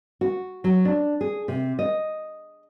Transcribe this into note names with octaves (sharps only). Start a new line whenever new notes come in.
F#4
F#3
D4
G#4
C3
D#5